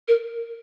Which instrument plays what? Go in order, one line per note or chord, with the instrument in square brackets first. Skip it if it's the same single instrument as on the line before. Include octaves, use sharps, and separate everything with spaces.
[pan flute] A#4